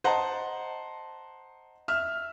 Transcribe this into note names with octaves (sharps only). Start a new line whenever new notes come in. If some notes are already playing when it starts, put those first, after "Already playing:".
C5 D#5 F#5 A5 A#5
E5 F6